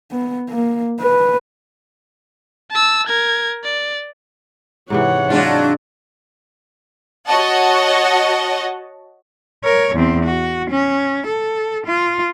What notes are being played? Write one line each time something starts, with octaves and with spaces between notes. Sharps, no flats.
B3
A#3
B4
A5 E6
A#4 G#6
D5
G#2 C3 E3 C#5 F#5
F#3 G#3 D4 F4
F#4 C#5 D#5 F#5 A5
A#4 C#5
E2 C4
F#4
C#4
A4
F4